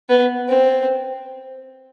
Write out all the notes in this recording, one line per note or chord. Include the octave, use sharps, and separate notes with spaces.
B3
C4